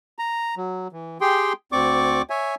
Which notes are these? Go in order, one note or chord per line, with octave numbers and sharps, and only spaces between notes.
A#5
F#3
E3
G4 G#4 G5 C6
D2 C4 D5 C#6 D6
C#5 E5 G#5